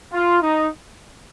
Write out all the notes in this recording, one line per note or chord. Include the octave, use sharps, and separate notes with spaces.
F4
D#4